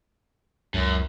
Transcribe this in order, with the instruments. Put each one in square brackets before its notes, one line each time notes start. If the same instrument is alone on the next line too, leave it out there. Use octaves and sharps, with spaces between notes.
[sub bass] C#2 [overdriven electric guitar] F#2